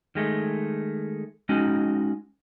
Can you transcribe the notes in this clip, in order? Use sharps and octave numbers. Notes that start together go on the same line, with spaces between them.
D#3 G#3 A3
G#3 C#4 D#4 F#4